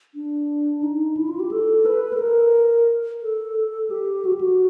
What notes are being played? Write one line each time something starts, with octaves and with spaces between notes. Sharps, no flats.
D4
D#4
E4
F4
G4
A4
B4
A4
A#4
A4
G4
F#4
G4
F#4